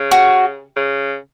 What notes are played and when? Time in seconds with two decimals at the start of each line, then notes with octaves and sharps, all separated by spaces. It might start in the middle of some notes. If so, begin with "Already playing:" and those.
Already playing: C#3
0.11 F#4
0.76 C#3